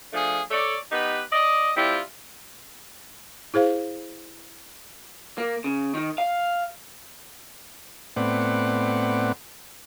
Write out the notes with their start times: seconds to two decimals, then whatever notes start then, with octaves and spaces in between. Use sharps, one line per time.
0.13 F3 A3 D4 G#4
0.51 A4 C#5 D5
0.92 B3 D#4 G4 B4
1.32 D5 D#5
1.76 G3 C4 E4 F4
3.54 E4 G#4 C5 F5
5.38 A#3
5.64 C#3
5.95 D#3
6.18 F5
8.16 A2 B3 C4 D5 F#5